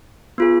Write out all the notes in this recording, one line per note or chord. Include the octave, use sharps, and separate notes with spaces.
B3 F4 G#4